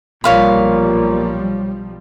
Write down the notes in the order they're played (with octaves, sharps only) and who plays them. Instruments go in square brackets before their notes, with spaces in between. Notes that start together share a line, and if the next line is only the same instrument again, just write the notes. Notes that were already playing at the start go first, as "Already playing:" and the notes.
[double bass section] B1 F3 G3 [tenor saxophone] A#2 [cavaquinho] C#5 F5 B5